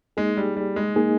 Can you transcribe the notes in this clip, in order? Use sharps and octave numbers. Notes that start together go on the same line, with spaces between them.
G#3 A#3 D#4 G#4
G3
G3
G#3
A#3 D#4 G#4